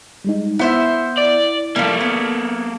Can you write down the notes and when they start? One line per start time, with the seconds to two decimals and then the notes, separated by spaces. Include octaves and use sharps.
0.24 G3 G#3 D#4
0.59 B3 E4 C5 E5
1.18 D5
1.76 F3 G3 A#3 A4
2.01 B3 F6 G#6